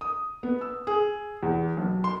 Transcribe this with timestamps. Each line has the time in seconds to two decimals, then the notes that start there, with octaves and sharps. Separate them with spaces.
0.01 D#6
0.43 B3
0.61 E6
0.87 G#4
1.43 E2
1.77 B1
2.04 C6